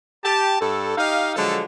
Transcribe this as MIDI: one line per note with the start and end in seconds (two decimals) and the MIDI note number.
0.24 0.59 67
0.24 0.59 81
0.60 0.95 43
0.60 0.95 69
0.97 1.34 63
0.97 1.34 67
0.97 1.34 75
0.97 1.34 77
1.36 1.62 50
1.36 1.62 53
1.36 1.62 54
1.36 1.62 56
1.36 1.62 69